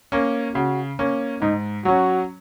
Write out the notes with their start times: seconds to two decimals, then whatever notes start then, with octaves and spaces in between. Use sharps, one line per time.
0.12 A#3 C#4
0.55 C#3 F#4
0.99 A#3 C#4
1.42 G#2 D#4
1.85 F#3 C#4 F#4